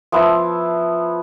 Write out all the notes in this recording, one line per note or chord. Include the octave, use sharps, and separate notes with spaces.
F3 B3 E4